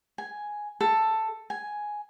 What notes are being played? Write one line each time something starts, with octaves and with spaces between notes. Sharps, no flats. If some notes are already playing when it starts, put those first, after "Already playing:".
G#5
A4
G#5